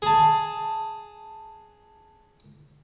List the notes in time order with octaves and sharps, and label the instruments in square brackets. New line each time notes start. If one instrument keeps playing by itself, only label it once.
[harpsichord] G#4 A5